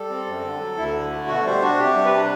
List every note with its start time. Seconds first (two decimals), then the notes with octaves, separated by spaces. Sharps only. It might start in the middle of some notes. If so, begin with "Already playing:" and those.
Already playing: G3 A4
0.10 C4
0.26 F#2
0.44 D3
0.61 F#3
0.77 D2 E4
0.94 D3
1.11 A3
1.28 B2 F#4
1.45 G3 C5
1.62 D4 F#4
1.79 C3 G4
1.96 G3
2.05 B4
2.13 D4